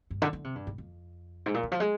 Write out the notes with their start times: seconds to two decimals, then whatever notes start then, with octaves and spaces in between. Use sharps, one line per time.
0.10 G2
0.22 D3
0.33 D3
0.44 C3
0.55 G2
0.67 G#2
0.78 F2
1.46 G#2
1.54 A#2
1.63 D3
1.72 F3
1.80 G#3